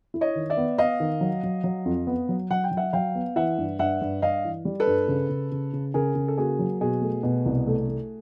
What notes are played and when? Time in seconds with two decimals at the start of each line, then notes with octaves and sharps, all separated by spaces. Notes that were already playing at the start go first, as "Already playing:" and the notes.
0.14 E4
0.21 C#5 D#5
0.35 D#3
0.50 D5 E5
0.57 B3
0.78 B3 D#5 F5
1.00 D#3
1.21 F#3
1.44 F#3
1.64 F#3
1.85 F2
2.07 B3
2.29 F#3
2.50 F#3 F#5
2.64 G5
2.71 F#3
2.77 E5 F#5
2.93 F#3 F5 G5
3.15 B3
3.36 E3 E5 F#5
3.58 G2
3.79 G2 E5 F#5
4.02 G2
4.22 G2 D#5 F5
4.45 E3
4.65 G3
4.80 A4 B4
4.87 G2
5.08 C#3
5.29 C#3
5.52 C#3
5.73 C#3
5.94 C#3 G#4 A#4
6.15 C#3
6.28 A4
6.38 A#3 F#4 G#4
6.59 F#3
6.81 B2 F#4 G#4
7.01 A3
7.23 B2
7.46 C2
7.67 A3
7.88 A3